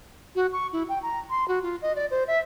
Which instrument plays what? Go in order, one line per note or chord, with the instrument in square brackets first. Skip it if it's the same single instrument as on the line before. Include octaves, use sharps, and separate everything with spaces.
[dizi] F#4
C#6
E4
G5
A#5
C6
F#4
F4
D#5
D5
C5
E5